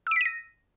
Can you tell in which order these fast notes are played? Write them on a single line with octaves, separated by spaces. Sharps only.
E6 D7 B6 D#7 A#6